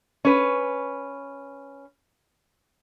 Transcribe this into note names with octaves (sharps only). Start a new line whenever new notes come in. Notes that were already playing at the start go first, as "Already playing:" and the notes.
C#4 B4